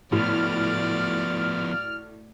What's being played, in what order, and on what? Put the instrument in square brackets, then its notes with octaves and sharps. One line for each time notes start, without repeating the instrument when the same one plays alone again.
[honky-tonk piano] A2 [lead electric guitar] F3 B3 [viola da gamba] A3 F#4 D5 [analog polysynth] F6